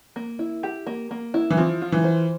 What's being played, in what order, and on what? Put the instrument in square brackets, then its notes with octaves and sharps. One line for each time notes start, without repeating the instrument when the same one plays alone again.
[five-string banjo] A#3
E4
G4
A#3
A#3
E4
[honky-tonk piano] E3
[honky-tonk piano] F3 [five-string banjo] C4
[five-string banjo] F4
[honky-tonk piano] E3
[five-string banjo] C5